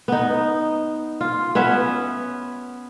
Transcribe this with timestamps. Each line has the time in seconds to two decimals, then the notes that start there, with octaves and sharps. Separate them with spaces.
0.08 B3 D#4
1.21 F4
1.55 B3 C#4 B4 E5